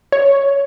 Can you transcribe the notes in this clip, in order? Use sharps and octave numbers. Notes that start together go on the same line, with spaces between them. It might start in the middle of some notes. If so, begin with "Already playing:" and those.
C#5